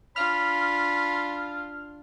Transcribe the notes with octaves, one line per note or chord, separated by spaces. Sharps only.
D4 F4 B5 F6